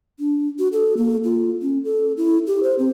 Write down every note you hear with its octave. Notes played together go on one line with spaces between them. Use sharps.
D4
F#4
A4
A#3
F4
C#4
A4
E4
G4
C5
C4